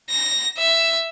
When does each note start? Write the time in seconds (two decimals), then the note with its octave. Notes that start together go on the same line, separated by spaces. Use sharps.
0.10 A#6
0.58 E5